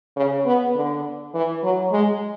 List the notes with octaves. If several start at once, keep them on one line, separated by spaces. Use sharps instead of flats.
C#3
B3
D3
E3
F#3
G#3